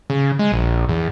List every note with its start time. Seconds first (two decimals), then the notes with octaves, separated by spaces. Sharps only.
0.10 C#3
0.39 G#3
0.52 A#1
0.89 E2